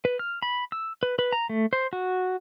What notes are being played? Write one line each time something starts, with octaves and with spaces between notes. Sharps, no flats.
B4
F6
B5
E6
B4
B4
A#5
A3
C5
F#4